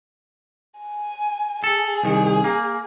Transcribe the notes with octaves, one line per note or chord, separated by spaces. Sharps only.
G#5
G#4 A4
C2 D#3
A#3